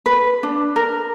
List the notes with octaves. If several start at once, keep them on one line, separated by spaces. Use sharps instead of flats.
B4
D4
A#4